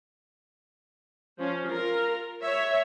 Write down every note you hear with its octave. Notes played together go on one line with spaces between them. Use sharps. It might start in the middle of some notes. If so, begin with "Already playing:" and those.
F3 C#4
F4 A#4
C#5 E5